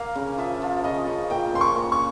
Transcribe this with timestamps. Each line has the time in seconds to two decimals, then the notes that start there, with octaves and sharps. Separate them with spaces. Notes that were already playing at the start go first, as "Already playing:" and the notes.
Already playing: A#3 F5
0.15 C#3
0.38 F3 E5
0.62 F3
0.84 C#3 D#5
1.07 C#3
1.30 A#2 G5
1.54 C#4 C6
1.61 C#6
1.76 A#2
1.92 C#6